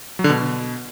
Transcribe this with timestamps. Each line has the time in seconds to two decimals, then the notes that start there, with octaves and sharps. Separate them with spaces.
0.19 F#3
0.24 D3
0.30 B2